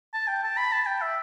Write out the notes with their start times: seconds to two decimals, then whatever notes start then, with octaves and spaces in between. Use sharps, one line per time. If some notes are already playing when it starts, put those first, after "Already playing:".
0.14 A5
0.28 G5
0.43 A5
0.57 B5
0.72 A5
0.86 G5
1.02 E5